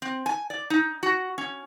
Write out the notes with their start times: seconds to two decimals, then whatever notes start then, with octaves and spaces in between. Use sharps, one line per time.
0.02 C4
0.26 G#5
0.50 D5
0.70 D#4
1.03 F#4
1.38 C#4